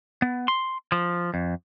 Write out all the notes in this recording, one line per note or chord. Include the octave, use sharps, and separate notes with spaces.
B3
C6
F3
F2